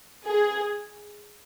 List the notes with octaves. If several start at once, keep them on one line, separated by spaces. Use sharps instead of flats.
G#4